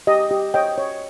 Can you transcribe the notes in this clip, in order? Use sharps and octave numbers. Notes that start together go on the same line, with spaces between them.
G4 D#5
G4
C#5 D#5 G5
C#5